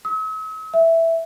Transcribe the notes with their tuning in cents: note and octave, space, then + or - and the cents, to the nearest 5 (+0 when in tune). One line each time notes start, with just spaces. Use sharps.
E6 -45
E5 +0